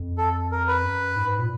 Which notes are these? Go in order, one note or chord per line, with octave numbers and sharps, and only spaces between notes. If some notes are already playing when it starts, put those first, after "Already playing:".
Already playing: F2
A4
A#4
B4
F#2
G#2
A#2